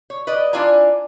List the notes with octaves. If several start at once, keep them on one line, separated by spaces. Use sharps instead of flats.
C#5
B4 D5 D#5
D4 E4 F4 D5 G#5 A#5